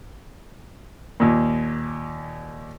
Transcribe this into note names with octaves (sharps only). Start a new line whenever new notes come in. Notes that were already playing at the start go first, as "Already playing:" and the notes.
D#2 A#2